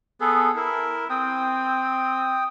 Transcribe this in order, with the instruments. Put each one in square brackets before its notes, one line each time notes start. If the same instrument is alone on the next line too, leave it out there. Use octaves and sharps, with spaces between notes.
[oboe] B3 [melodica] G#4 A4
[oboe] E4 [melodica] A#4
[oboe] C4 [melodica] G5 D#6